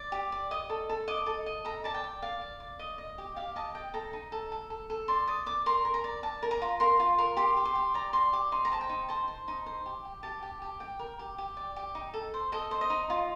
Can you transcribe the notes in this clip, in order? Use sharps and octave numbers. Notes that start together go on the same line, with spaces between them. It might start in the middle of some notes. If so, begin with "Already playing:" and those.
Already playing: D5
G4
D5
D#5 D#6
A4
A4
D#5 D6
A4
D#5
A4 A#5
D5 A5
G5
D5
D5 F5
D5
D5
D#5
D#5
G4
G4 F5
D#5 A5
D#5 G5
A4 A#5
D#4
A4
A4
A4
A4
D5 C6
D5 D#6
D5 D6
A#4 C6
A#4
A#5
D5
D5 A5
A#4
A#5
F4
A#4 C6
F4
A#4
G4 C6
G4
C6
G4
D5 A#5
D5 C6
G4 D6
D#4 C6
A#5
C5 A5
G5
D#4
C5 A5
C5
D#4
C5
G4
G4
G4 A5
G4
G4
G4 G5
A#4
G4
G4
D5
G4
D#4
A4
C5
A4 D#5
C5
D#5
D#4
F4